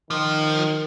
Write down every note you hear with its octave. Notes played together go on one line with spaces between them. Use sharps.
D#3 F3